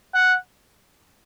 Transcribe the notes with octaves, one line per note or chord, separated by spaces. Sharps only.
F#5